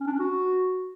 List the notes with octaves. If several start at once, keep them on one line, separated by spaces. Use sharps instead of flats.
C#4
D4
C#4
F#4